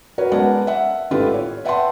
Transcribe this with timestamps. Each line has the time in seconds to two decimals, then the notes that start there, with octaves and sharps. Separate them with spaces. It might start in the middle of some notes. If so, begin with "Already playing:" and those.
0.18 F#4 A#4 B4 C#5
0.32 G#3 B3 A#4 D5 F#5 A5
0.67 E5 F#5
1.11 G#1 A2 F4 G4 A4 B4
1.34 C#5
1.65 B4 E5 F#5 G5 A5 C6